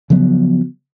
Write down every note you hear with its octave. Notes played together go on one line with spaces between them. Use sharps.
C#3 F3 F#3 B3